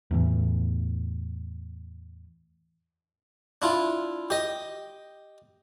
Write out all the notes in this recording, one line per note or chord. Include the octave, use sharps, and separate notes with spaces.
E2 A2 E3
D4 E4 F4
G4 D#5